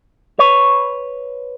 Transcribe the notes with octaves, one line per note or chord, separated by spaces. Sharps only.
B4 C#5